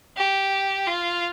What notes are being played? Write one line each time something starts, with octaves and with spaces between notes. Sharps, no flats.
G4
F4